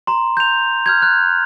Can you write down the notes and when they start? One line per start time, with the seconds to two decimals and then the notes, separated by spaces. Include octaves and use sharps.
0.07 A#5 C6
0.37 G6 F7
0.86 F6 G6 G#6
1.02 F#6 G6